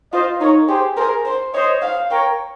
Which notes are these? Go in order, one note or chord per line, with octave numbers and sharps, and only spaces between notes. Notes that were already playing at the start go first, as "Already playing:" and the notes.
F4 C5 D#5
D#4 A#4 C#5
G4 G#4 C5
G#4 A#4 C5
C5
C5 C#5 D#5
F5
A#4 C#5 G5